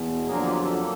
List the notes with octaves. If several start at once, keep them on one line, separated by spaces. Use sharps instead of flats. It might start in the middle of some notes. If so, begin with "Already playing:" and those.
Already playing: E2 B2
F2 D3 F#3 A#3 G#4 A#4
F4 G4
G4 A4
A#3